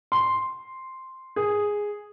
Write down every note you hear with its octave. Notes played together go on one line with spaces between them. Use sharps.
C6
G#4